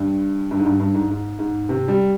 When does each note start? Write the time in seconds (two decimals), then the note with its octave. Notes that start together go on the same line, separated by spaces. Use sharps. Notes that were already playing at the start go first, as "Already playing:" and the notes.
Already playing: G2
0.51 G2
0.60 G#2
0.66 G2
0.80 G2
0.95 G#2
1.10 G#2
1.39 G#2
1.69 C3
1.88 G3